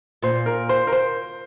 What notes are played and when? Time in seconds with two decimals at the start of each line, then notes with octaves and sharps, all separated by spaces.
0.23 A#2 C5
0.46 A#4
0.69 C5
0.87 A#4
0.93 C5